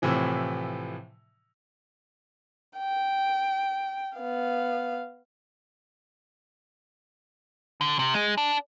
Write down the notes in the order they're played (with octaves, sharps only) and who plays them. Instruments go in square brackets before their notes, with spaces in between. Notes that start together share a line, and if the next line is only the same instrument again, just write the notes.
[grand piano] A2 C3 E3 F3
[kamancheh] G5
B3 F5
[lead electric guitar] D3
C3
G#3
D4